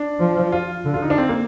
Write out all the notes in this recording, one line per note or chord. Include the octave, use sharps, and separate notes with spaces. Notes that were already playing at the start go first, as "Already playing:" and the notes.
Already playing: D4
F3
F4
D3
F4
D#4
D4
C4
A#3